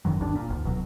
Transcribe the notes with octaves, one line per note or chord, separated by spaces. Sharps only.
G#1 F#2 D#3 F#3
G1 D#2 D4
A#2
F1 D2
D1 B2 F#3